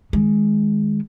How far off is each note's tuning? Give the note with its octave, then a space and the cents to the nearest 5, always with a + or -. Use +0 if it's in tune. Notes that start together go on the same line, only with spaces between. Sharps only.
D#3 +5 G#3 +0